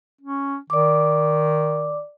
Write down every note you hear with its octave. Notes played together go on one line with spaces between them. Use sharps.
C#4
D#3 D5 D6